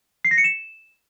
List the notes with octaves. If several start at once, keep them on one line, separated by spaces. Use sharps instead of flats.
C7
A#6
C#7
E7